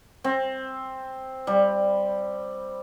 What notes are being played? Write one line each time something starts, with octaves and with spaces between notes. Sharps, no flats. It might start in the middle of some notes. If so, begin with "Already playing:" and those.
C4
G3